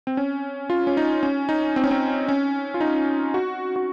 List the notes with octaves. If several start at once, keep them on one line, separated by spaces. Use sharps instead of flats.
C4
C#4
F4
C#4
D#4
C#4
D#4
C4
C#4
C4
C#4
F4
D#4
F#4
F#4